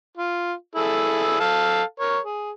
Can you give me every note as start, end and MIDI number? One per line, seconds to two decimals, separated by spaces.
0.17 0.53 65
0.75 1.39 64
0.75 1.39 68
0.75 1.39 69
1.40 1.82 69
1.40 1.82 77
1.40 1.82 81
2.00 2.18 70
2.00 2.18 73
2.25 2.51 68